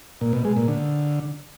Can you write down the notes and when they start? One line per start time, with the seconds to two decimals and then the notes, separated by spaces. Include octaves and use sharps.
0.21 A#2
0.33 B2
0.45 G#3
0.57 A#2
0.68 D3